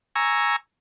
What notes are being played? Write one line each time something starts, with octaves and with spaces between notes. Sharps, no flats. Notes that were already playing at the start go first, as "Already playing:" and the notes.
G#5 A#5 C#6 E6